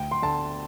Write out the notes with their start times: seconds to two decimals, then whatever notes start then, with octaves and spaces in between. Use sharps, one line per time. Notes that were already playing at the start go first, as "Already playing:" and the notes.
Already playing: D2 G5
0.11 C6
0.22 D3 A5